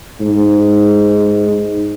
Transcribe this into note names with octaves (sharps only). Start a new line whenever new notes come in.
G#2